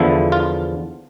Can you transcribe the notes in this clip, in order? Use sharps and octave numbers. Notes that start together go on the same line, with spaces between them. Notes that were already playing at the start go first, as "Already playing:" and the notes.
Already playing: E2 D3 F3 E4
F4